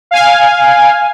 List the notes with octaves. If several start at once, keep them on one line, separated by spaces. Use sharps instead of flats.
F5 G#5